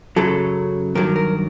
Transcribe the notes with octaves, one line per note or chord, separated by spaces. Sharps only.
F#2 C#3 F#3 A4
G2 D#3 F#3 A#4
A#4